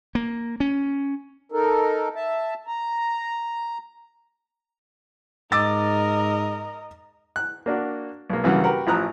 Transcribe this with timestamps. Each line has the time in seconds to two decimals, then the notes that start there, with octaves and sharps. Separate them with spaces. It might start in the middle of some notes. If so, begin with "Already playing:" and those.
0.15 A#3
0.60 C#4
1.52 D#4 A4 A#4
2.16 E5 A5
2.67 A#5
5.52 G#2 A#4 D#5 D6 E6 A6
7.36 F#6
7.66 A#3 D4 F#4
8.30 B1 A#3
8.44 G2 C#3 E3 F#3 A#3 F#4
8.64 F#4 G4 A#4 B4 F#5
8.87 A1 F3 E4 A#5 D#6 F#6